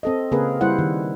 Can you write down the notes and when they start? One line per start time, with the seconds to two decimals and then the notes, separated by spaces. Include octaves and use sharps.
0.03 C4 A4 D#5
0.32 C#3 A#3 C4 G#4 A#4 B4
0.61 G3 E4 C5 F#5
0.79 D#3